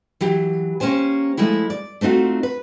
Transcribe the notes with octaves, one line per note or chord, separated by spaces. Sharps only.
E3 F#3 G4
A#3 C#4 G4 C5 G#5
F3 G#3 A3 E4
D5
A3 C4 D#4 F4 F#4
B4